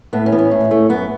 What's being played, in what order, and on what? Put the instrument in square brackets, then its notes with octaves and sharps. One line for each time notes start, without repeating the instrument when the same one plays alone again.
[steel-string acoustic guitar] A2 B3
C#4
E3 B3
C#4
A2
A3
F#2 B3